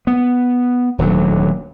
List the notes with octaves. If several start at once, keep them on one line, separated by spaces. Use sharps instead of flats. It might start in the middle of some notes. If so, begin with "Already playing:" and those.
B3
D#1 D2 F#3